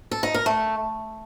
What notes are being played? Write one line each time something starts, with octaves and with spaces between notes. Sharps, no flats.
A4
D#4
A#4
A3